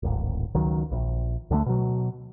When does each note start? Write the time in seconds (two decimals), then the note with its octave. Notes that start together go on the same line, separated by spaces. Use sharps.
0.03 D1 G#1
0.55 C#2 D#3 F#3
0.92 A#1
1.51 D2 D3 G#3 A3
1.66 B2 F#3